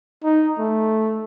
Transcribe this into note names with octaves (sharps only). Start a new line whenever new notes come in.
D#4
A3